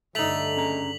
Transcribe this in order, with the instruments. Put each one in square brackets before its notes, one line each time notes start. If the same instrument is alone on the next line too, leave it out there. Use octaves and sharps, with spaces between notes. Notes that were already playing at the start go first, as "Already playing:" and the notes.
[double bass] G2 D3 [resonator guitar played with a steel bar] A3 D#4 [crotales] B6 F7 F#7
[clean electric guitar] C#4 G#4 A#5